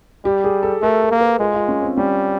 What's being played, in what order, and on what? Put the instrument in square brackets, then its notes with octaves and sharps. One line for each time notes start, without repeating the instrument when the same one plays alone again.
[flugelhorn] G3 [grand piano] G4
[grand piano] G#4
A4
[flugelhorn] A3 [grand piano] A#4
[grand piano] A#4
[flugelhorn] A#3
[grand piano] B4
[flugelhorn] G#3 [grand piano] F4
[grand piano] F4
C#4
C4
[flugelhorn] G3 [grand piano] C#4